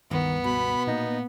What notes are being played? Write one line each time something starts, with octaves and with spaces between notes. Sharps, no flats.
C#2 G2 D#3 B3
B2 B5
A#2 A#3 D#4